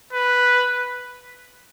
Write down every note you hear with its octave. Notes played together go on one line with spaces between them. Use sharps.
B4